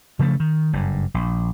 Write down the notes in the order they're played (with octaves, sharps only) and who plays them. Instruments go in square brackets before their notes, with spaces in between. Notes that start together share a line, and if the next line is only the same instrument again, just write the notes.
[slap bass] C#3 F3 G#3 A3
D#3
F#1 G2
A#1